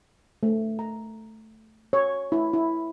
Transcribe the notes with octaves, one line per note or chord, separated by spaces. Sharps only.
A3
A#5
C#5
E4
E4